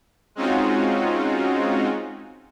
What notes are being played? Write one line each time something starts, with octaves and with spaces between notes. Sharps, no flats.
G#3 C4 C#4 D#4 F4 F#4